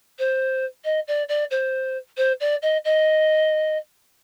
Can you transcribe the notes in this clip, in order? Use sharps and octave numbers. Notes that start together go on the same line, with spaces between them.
C5
D#5
D5
D5
C5
C5
D5
D#5
D#5